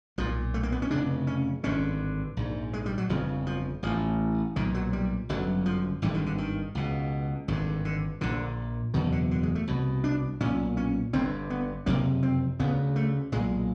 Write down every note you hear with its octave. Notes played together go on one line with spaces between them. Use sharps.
B1 A#2 F3
A3
A#3
B3
C#4
F1 F2 C#3 D4
C#4
G#1 G2 D3 C#4
A#1 G#2
G#3
G3
F#3
G1 F2 C#3 F3
F3
A1 A2 F3
B1 A#2 D#3
F#3
G3
G1 F#2 D3 F#3
F3
G#1 G2 D3 E3
D#3
D3
D#3
C#2 B2
G#1 G2 D3 D#3
D3
A#1 A#2 D3
F#1 E2 B2 D#3
D3
D3
G#3
A3
C2 B2
D4
B1 A#2 C#4
C#4
G1 G2 D3 C4
B3
F#1 F2 C3 A#3
C4
D2 C#3 B3
A3
B1 A#2 G#3